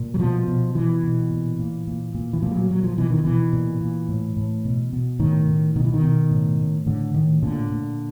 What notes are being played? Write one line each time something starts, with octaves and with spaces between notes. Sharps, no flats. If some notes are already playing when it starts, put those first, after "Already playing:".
Already playing: A#2
F#3
B2 F3
B2
B2 E3
B2
A#2
A#2
A#2
A#2
E3
A#2 F3
G3
F#3
A#2 F#3
F3
B2 E3
D#3
B2 E3
A#2
A#2
A2
A2
B2
B2
A2 D#3
A2
B2 D#3
E3
D#3
B2
A2
A2
A2 D3
A2 D#3
A#2 D3
A#2